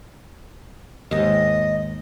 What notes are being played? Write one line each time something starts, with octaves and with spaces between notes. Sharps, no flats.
D#2 G#2 D#5